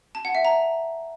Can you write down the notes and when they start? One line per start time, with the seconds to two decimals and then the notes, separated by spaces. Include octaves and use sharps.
0.15 A5
0.25 F#5
0.35 E5
0.45 A#5